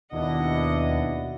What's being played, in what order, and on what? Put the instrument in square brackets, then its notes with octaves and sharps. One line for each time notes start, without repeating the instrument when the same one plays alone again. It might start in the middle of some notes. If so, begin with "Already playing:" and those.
[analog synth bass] D#2 [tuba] B2 [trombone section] D4 E4 [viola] D#5 F#5